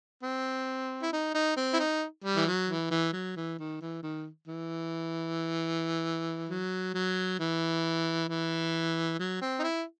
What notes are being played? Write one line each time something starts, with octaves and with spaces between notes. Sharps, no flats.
C4
E4
D#4
D#4
C4
E4
D#4
G3
E3
F#3
E3
E3
F#3
E3
D#3
E3
D#3
E3
F#3
F#3
E3
E3
F#3
C4
D#4
E4